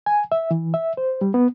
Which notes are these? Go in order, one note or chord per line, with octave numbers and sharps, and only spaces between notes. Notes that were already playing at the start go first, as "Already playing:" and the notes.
G#5
E5
E3
E5
C5
G3
B3